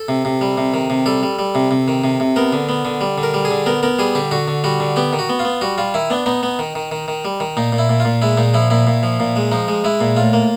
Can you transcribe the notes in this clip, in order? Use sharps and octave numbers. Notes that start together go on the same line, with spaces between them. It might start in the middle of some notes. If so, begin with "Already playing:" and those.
Already playing: A4
C3
C3
G3
C3
D#3
C3
G3 A4
G3
G3
C3
C3
D#3
C3
C3
B3 A#4
D3
B3
D3
G3
D3
A#4
G3
G#4
D3
B3 A#4
B3 A#4
G3 G#4
D3 G4
D3 F#4
D3
G3 F#4
D3
B3 G4
D#3
F#4
B3
F4
B3
G3 F#4
G3 F4
D#3 E4
B3 D4
B3 D#4
B3
D#3
D#3
D#3
D#3
G3
D#3
A#2 D#4
A#2
E4
A#2
F4
A#2
G#3 E4
A#2 D#4
F3 E4
A#2 E4
A#2
F3
A#2
G#3
F3 D#4
G#3
G#3 E4
A#2
A2 F4
A#3